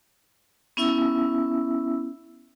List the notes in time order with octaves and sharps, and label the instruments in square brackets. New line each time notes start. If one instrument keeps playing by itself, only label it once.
[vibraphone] B3 C#4 E4 E5 E6